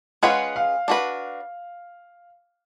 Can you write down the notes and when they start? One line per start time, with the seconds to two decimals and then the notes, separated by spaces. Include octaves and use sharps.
0.23 G#3 C#4 F4 G#4 B4 F#5
0.56 F5
0.88 D4 F#4 B4